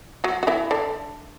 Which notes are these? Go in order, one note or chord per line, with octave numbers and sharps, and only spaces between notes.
F#3 F#4
F#4
E3 E4
D3 D4